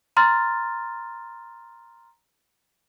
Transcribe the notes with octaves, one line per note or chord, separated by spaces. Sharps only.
A#5 C6 F6 A6